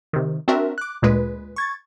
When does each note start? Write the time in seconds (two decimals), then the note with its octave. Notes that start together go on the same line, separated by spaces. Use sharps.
0.13 C3 D#3
0.48 C4 D4 F#4 A#4 E5
0.78 D6 F#6
1.02 D2 A#2 G#3 B4
1.56 C#6 G#6 A6